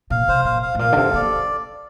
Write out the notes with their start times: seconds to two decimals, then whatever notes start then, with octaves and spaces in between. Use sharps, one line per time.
0.10 A#2 F5
0.28 C3 C5
0.45 A#2 F5
0.62 F5
0.75 A2
0.79 A#2 F5
0.92 D3
0.97 C3 A4
1.14 A#3 D5